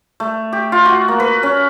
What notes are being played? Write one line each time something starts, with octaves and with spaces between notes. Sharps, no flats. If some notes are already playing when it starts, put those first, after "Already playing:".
A3
G4
F4
F#4
A#3
B4
C#4